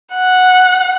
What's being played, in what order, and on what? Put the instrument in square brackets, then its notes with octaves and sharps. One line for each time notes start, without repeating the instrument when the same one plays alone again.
[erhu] F#5